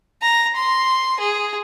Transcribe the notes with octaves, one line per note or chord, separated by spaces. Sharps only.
A#5
C6
G#4